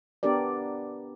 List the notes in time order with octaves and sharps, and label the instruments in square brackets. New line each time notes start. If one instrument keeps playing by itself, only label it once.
[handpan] B3 D4 G4 A#4 D5